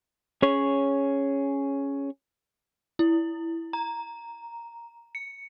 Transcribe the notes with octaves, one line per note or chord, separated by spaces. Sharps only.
C#4 G#4 C#5
E4
A#5
C#7